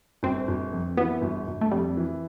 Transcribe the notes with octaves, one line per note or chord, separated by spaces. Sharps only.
G1 C4
G1
F2
E3 B3
G1
G1
A3
F2 G3
E3